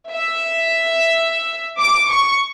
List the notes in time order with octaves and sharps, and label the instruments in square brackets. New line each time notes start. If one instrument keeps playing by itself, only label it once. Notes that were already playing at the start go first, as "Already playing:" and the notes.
[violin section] E5
D6
C#6